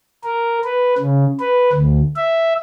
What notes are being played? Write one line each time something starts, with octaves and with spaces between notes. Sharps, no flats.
A#4
B4
C#3
B4
D2
E5